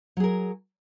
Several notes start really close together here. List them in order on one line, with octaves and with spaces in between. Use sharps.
F#3 G#4 A#4